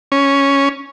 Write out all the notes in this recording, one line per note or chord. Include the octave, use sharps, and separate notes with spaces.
C#4